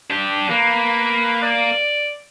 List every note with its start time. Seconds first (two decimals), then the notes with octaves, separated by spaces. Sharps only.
0.10 D4 G4
0.50 A#3 B4
1.42 D5